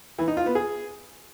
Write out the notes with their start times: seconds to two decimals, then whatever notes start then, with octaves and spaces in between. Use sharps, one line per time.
0.19 E3
0.28 D#4
0.37 F4
0.46 B3
0.55 G#4